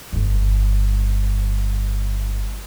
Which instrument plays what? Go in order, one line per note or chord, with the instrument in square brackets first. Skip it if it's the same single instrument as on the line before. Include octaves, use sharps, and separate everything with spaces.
[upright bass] G1 G2